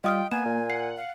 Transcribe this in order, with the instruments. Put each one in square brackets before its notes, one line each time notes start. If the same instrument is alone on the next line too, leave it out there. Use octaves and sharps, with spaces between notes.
[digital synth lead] G3 [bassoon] F4 [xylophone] D#5 D#6 F6 [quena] G5
[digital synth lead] A#3 [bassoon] B3 [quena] G#5 [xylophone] E7
[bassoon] A#2
[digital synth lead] F#5 [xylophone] C7
[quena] F5